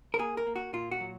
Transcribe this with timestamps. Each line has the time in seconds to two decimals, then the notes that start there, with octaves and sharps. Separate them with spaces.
0.14 A#4
0.19 A#3 G#4
0.37 A#4
0.47 A#3
0.56 F#4
0.73 A#2 F4
0.91 F#4
1.01 F#3